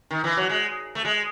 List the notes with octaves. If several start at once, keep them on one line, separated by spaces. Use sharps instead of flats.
D#3
E3
F#3
G#3
A3
G#3